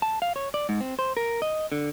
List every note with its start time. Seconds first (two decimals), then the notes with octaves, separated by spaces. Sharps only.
0.02 A5
0.22 F5
0.36 C#5
0.54 D5
0.69 G#2
0.80 C4
0.99 C5
1.17 A#4
1.42 D#5
1.72 D3